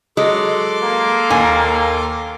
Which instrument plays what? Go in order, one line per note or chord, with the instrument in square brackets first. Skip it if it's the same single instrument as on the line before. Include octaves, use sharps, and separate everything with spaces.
[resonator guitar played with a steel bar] F#3 G#3 [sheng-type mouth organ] A4 C6 D6
[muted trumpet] A#3
[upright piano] D#2 [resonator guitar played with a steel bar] G#5